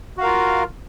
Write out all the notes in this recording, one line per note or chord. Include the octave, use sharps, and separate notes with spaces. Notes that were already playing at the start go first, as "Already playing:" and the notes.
F4 F#4 A#4 F5